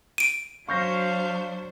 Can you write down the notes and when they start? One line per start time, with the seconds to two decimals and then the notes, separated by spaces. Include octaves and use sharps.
0.18 D7 D#7
0.69 F#3 D4 C5 F5 C#6 G6 A#6